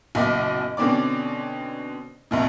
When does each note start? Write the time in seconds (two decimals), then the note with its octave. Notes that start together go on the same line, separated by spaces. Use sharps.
0.15 F#1 B1 A#2 E5 D6
0.77 B2 D3 C4 C#4 D5 D6
2.31 A#1 D#2 C3